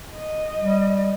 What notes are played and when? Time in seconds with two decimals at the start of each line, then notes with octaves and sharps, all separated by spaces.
0.16 D#5
0.59 G3